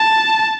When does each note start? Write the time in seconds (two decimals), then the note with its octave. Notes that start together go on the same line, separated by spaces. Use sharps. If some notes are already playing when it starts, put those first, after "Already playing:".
Already playing: A5